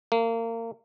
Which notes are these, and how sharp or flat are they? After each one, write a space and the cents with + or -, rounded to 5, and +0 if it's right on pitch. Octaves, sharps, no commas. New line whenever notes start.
A#3 -30